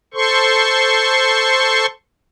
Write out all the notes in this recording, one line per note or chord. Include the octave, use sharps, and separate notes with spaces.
A4 C5 C6 C#6